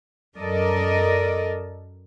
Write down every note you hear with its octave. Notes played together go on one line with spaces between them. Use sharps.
F#2 A4 A#4 D5 D#5